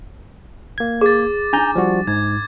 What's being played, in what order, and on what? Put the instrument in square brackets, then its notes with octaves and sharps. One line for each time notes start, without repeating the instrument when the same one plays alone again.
[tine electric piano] A#3 G#6
[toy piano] G#4 [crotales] D6 A6
[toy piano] D4 D#4 [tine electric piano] G#5 A#5 G6
[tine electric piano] F3 G3 F#4
[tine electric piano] G#2 [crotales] G#6